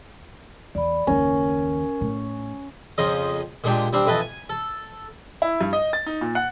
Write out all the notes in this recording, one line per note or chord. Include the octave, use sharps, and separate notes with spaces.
E2 D5 B5
F#1 D#2 C#4 A#4
A2
F2 C#3 F3 D#5
A#2 G#3 D4 G4
G3 C4 D4
F2 E3 B4 D#5 A5
G#5
A4
E4
G2
D#5
A6
D#4
A#2
F#5